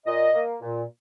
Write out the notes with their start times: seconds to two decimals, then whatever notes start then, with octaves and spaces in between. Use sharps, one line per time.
0.06 A#2 D#5
0.34 A#3
0.61 A#2